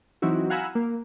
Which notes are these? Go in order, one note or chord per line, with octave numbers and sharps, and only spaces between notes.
E3 F#3 C4 D#4 E4 F#4
F5 F#5 G#5 A#5 B5 E6
A#3